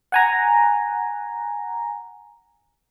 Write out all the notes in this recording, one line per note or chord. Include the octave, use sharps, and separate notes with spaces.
F#5 G#5 A#5